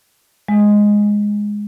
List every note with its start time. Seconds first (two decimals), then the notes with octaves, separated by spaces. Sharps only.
0.48 G#3